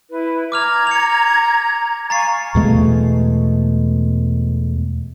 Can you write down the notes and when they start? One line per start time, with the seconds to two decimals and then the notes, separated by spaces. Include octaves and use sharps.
0.10 E4 B4
0.52 A#5 D6 F6 G#6 F7
0.87 C#7 F7
2.10 F5 G#5 A#5 C#6 A6 C7
2.55 E2 B2 G#3 A3